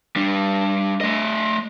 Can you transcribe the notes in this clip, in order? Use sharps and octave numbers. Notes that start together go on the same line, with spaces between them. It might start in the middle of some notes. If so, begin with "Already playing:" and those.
G3 D4
A3 D#5